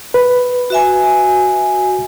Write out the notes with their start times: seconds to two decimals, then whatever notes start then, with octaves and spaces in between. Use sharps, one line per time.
0.14 B4
0.70 F#4 E5 G#5